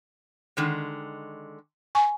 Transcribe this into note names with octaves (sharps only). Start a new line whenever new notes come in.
D3 D#3 G#3
G#5 C#6